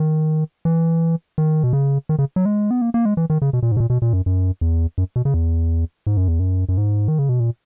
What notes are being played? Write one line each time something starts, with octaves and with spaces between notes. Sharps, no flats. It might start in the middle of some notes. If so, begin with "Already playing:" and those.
Already playing: D#3
E3
D#3
B2
C#3
D#3
C#3
F#3
G#3
B3
A#3
A#3
G#3
E3
D#3
C#3
B2
A#2
G#2
B2
A#2
B2
A#2
F#2
F#2
E2
F#2
B2
C#3
E2
G#2
F#2
E2
F#2
F#2
G#2
D#3
C#3
B2
A#2